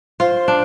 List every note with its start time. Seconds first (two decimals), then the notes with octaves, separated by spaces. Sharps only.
0.20 F4 C5
0.48 D4